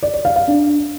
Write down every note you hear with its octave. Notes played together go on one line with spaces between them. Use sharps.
D5
D5
F5
F5
D4